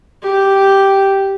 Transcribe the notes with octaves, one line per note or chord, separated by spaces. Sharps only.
G4